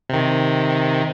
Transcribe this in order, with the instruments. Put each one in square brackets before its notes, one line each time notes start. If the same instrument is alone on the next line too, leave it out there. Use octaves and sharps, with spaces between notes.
[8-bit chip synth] C3 D#3